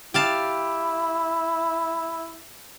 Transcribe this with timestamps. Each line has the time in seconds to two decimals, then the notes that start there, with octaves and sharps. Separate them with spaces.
0.14 E4 G4 F5 A5